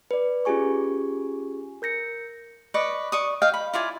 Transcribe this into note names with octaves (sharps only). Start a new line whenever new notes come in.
B4 D5
C#4 F4 G4 G#4 G#5 C#6
A#4 G6 A#6 C#7
B4 D5 D#5 C#6
D5 C#6 D#6
D#5 F5 G5
B5
E4 F4 D5 G#5